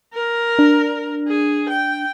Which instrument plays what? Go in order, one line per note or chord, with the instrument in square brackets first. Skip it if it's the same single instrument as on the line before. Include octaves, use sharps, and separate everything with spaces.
[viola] A#4
[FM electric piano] D4
[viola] G#4
G5